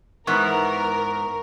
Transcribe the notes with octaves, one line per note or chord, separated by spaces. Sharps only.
G#2 E3 B3 A#4 C#6